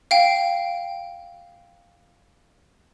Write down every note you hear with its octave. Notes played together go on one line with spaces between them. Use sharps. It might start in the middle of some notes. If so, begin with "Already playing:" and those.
F5 G5